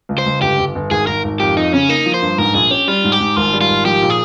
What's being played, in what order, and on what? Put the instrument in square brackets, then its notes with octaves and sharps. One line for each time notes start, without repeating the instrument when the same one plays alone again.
[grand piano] C#2
[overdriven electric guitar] C5
[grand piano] C#2
[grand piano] G1 [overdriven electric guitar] G4
[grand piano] G1
G1
[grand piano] G#1 [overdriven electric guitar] G#4
[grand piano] G#1 [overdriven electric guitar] A#4
[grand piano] G#1
[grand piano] F2 [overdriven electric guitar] G4
[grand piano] F2 [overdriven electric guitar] D#4
[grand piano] C#3 [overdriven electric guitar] C#4
[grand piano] A#3 [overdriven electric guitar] D#4
[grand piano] F3
[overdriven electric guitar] C5
[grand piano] G2
[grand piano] G#2 [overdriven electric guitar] A#4
[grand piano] A#1 [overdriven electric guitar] G#4
[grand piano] C#4 [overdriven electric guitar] G4
[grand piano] G3 [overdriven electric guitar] F4
[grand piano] G#2
[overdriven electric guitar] G4
[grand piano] G#2
[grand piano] G#1 [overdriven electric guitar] F4
[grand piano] G3
[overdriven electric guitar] F4
[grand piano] G#1
[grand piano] F3 [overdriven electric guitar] G4
[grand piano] A#2
[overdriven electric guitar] G#4